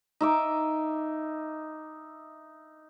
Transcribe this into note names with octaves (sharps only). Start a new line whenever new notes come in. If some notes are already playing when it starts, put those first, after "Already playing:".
D#4 E5 D6